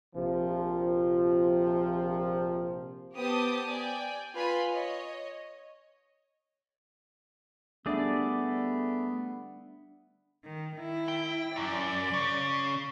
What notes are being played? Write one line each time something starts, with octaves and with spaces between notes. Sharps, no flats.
A#1 C3 F3
B3 G4 C5 A5 D#6
D5 G5 G#5
F4 B4 G#5 B5
C#5 D#5
G3 A3 B3 D4 G#4 D5 E5
D#3
D#3 E4
G5
F#2 D5
C#3